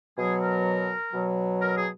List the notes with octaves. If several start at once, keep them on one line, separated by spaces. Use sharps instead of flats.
B2 F#3 G#4
A#4
B2 F#3
A#4
G#4